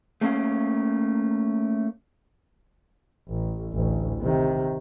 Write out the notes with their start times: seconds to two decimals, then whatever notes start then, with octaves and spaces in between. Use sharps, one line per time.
0.21 A3 A#3 C#4 A#4 F5
3.29 A1
3.72 A1 D2
4.21 C3 D#3